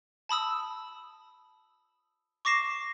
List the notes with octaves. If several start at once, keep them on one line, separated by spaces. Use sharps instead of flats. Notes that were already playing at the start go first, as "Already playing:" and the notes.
A5 B5 D#6 E6
C#6 D6 A#6 C7 E7